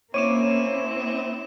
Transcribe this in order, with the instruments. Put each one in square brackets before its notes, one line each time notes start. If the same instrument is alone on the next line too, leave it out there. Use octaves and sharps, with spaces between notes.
[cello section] A#3 C#4 [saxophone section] C4 E4 [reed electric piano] C#5 D6 [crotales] D#7 E7